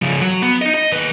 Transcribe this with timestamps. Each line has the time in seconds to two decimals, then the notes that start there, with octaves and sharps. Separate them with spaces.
0.02 C#3 F3
0.21 F#3
0.42 B3
0.62 D#4 D#5
0.74 D#5
0.92 D#2 B4